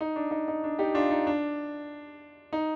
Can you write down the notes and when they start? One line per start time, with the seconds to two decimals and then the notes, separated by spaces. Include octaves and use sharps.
0.01 D#4
0.16 D4
0.31 D#4
0.48 D#4
0.64 D4
0.79 D#4 G4
0.95 D4 F4
1.11 D#4
1.27 D4
2.53 D#4